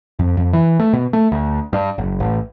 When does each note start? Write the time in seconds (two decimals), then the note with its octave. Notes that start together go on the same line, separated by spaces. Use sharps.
0.19 F2
0.37 F2
0.53 E3
0.79 A3
0.93 B2
1.13 A3
1.32 D2
1.73 G2
1.98 F#1
2.20 A1